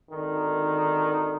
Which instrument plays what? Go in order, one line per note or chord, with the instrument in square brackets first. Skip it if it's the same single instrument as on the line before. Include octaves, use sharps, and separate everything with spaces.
[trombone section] G#1 D3 D#3